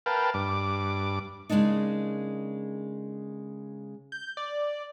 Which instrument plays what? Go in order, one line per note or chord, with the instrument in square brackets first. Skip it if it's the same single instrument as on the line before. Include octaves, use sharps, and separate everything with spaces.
[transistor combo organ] A#4 B4 F5 G5 A5
G2 D6
[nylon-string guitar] C#3 G#3 A#3 D4 D#4
[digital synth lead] G6
D5